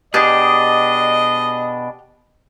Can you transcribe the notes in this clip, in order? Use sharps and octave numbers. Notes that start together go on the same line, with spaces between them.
B2 D4 G4 G#4 D5 D#5